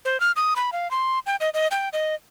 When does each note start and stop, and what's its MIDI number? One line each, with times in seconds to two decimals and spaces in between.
0.05 0.20 72
0.20 0.32 89
0.36 0.54 87
0.56 0.70 83
0.72 0.90 77
0.91 1.19 84
1.26 1.36 79
1.41 1.50 75
1.54 1.67 75
1.71 1.89 79
1.93 2.15 75